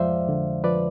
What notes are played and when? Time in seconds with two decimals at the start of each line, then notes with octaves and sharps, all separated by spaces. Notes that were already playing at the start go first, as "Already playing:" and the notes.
Already playing: F2 F3 G#3 C5 D5 E5 F5
0.29 D3
0.64 F3 B4 D5